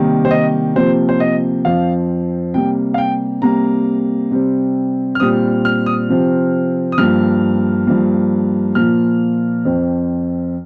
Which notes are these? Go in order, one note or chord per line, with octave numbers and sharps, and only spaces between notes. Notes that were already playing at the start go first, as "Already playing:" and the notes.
Already playing: C3 D#3 G3 A#3
C5
D#5
C3 F3 A#3 C5
C5
D#5
F2 F3 C4 F5
C3 G3 A#3 G5
F5
G5
C3 G3 A#3 A#5
C3 G3 C4
F6
A#2 G3 C4 D#6
F6
D#6
C3 F3 C4
D#6
G2 F3 A#3 F6
G2 F3 A#3
A#2 F3 A#3 F6
F2 F3 C4